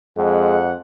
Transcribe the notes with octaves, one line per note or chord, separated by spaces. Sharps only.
F2 G#3 F#5